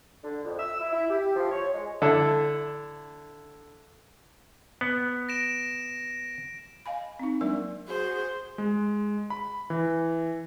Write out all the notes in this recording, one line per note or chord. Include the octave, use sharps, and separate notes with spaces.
D3
F2
E6
E4
E4
G4
F3
C#5
G#3
D3 E4 A4
B3
A#6 D7 E7
D#5 F5 G#5 B5
C4 D#4
F#3 G#3 A#3 D4 A#4 D5
F#4 G#4 C5
G#3
B5
E3